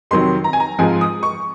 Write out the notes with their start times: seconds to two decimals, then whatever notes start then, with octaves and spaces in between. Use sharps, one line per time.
0.11 F2 C3 D#3 F#3 C4 C6
0.44 A#5
0.53 G#5
0.60 A#5
0.79 G#2 F3 G#3 C4 F4 G#5
1.01 D#6
1.23 C#6